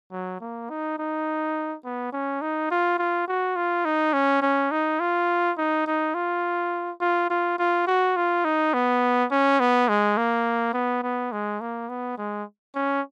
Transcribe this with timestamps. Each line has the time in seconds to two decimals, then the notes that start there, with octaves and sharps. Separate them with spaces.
0.12 F#3
0.41 A#3
0.70 D#4
0.99 D#4
1.85 B3
2.13 C#4
2.42 D#4
2.71 F4
2.98 F4
3.28 F#4
3.56 F4
3.85 D#4
4.13 C#4
4.42 C#4
4.71 D#4
5.00 F4
5.58 D#4
5.87 D#4
6.15 F4
7.01 F4
7.30 F4
7.58 F4
7.87 F#4
8.16 F4
8.45 D#4
8.74 B3
9.31 C#4
9.60 B3
9.89 G#3
10.17 A#3
10.74 B3
11.03 B3
11.32 G#3
11.61 A#3
11.89 B3
12.18 G#3
12.75 C#4